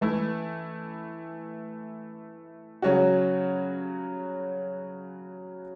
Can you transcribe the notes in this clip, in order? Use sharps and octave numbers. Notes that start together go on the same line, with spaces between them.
E3 A3 E4
C#3 F#3 C#4 F#4